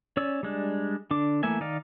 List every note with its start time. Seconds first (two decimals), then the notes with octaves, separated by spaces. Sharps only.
0.17 C#4 C#5 D5 E6
0.43 G3 G#3 D4
1.11 D3 D4 D6
1.43 E3 A3 A#3 E5 G#5
1.60 D#3 D#4 D5 F5